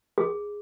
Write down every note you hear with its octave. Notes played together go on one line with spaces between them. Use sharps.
G#4